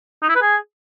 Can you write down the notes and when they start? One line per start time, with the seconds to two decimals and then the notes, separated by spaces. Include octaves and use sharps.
0.22 D#4
0.29 E4
0.35 B4
0.42 G#4